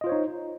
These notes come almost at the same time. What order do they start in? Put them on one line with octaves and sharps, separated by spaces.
D#5 F4 C5 C#5 D#4